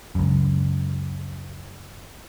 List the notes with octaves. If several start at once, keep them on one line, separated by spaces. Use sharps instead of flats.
C#2 F#2